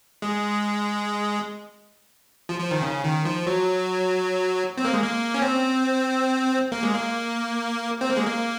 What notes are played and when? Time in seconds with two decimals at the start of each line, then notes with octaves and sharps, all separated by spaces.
0.22 G#3
2.49 F3
2.60 F3
2.71 D#3
2.82 C#3
3.04 D#3
3.25 F3
3.47 F#3
4.77 C4
4.85 A#3
4.93 G#3
5.02 A#3
5.34 C#4
5.42 C4
6.72 A#3
6.83 G#3
6.95 A#3
8.01 C4
8.09 A#3
8.17 G#3
8.25 A#3